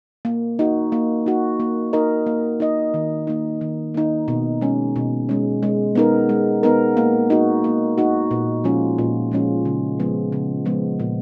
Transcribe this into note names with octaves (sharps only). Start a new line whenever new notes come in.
A#3
D#4 F#4
A#3
D#4 F#4
A#3
D#4 A#4 D#5
A#3
D#4 A#4 D#5
D#3
A#3 D#4
D#3
A#3 D#4
B2
G#3 C#4
B2
G#3 C#4
G#3
B3 D#4 A#4
G#3
B3 D#4 A#4
A#3
D#4 F#4
A#3
D#4 F#4
A#2
F3 G#3 C#4 F4
A#2
F3 G#3 C#4 F4
C#3
F3 G#3 B3
C#3
F3 G#3 B3
A#2